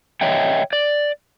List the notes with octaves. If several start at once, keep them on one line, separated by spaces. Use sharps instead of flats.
C#5 D#5 E5 G5
D5